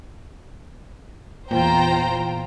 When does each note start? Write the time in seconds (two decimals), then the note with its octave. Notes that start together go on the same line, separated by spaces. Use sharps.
1.51 E2 A#2 F4 C5 G5 A#5